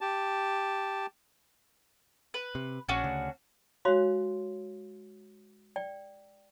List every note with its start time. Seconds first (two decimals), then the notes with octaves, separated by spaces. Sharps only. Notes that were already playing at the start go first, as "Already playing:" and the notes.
0.01 G4 A5
2.34 B4
2.55 C3
2.89 A#1 C#4 D4 F#4
3.04 D2 C#3
3.85 G#3 F#4 C#5 F5 C6
5.76 D5 G5